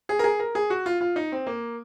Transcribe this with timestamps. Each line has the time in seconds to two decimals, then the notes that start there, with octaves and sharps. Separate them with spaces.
0.09 G#4
0.19 A#4
0.24 G#4
0.40 A#4
0.55 G#4
0.70 F#4
0.86 F4
1.01 F4
1.16 D#4
1.32 C4
1.47 A#3